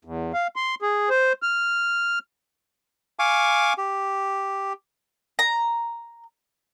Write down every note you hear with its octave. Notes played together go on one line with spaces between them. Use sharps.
E2
F5
C6
G#4
C5
F6
F5 G#5 C#6 D6
G4
A#5